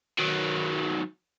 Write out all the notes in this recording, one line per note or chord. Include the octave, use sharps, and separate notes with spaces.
D#3 F#3